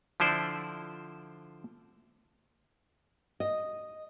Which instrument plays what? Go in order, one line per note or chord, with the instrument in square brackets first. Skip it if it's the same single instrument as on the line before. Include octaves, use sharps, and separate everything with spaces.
[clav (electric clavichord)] D3 F3 E4 C5 D5
[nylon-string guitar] D#5